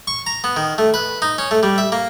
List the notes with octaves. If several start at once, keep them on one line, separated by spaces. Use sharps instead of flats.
C#6
A#5
B3
D#3
A3
B4
D#4
C#4
A3
G3
E5
A#3